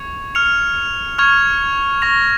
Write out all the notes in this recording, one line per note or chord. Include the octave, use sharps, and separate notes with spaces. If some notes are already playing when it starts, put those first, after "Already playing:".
Already playing: C#6 G#6 C#7 F7
F6 C#7 F7
C#6 F6 G#6 F7
C#6 A#6 F7